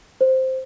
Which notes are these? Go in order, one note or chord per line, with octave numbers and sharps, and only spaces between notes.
C5